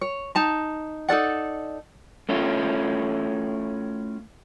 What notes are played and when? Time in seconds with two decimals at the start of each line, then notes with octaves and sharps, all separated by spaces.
0.01 C#5
0.35 D#4 A5 A#5
1.08 D#4 A4 D5 F#5
2.29 A3 C#4 E4 F4